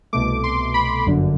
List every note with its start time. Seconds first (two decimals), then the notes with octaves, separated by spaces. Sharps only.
0.13 C2 B2 A3 D6
0.44 C6
0.74 B5
1.06 G1 F#2 D3